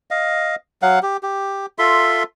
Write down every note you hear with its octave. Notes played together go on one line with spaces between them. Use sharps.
D#5 F5
F#3 F5 F#5
G4
G4
F4 A4 E5 C6